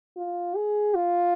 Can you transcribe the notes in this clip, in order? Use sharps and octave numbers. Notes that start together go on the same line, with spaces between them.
F4
G#4
F4